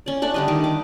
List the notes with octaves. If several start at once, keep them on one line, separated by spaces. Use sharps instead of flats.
C#4 D5
A3 D4 F#5
D3 G3 D#5
D#3 G4
D6